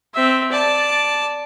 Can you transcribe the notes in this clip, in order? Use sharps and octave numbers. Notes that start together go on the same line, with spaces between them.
C4 E5
D5 A5